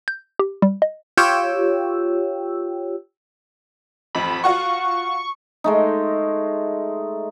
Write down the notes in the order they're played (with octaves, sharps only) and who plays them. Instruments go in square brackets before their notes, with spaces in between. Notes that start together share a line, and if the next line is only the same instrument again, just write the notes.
[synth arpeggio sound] G6
G4
G3
D#5
[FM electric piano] F4 G4 C#5 G5 E6
[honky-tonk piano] A1 F2 [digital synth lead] B5
[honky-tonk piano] F4 F#4 F#5 [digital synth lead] C#6
[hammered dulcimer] G#3 A3 D#4